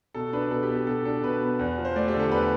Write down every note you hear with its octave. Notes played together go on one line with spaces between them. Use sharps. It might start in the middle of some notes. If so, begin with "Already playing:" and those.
B2 A4
D4 B4
B2 A4
G4
B3
G4
B2 A4
D4 A4
B2 B4
B3
E2
F3
C5
A3 D5
G4
D3
A4
E2 B4